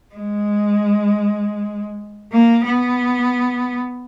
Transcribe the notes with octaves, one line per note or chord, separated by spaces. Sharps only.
G#3
A#3
B3